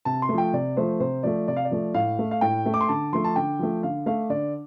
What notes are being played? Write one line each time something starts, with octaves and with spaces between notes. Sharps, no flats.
C3 A5
C6
A3
F3 G5
C3 D5
F3 A3 C5
C3 C5
F3 A3 D5
C3 D5
F5
D5
F3 A3
A2 F5
A3
F5
A2 G5
A3
D6
C6
D3 A5
F3 A3 C6
A5
D3 G5
F3 A3
D3 F5
A3 F5
D3 D5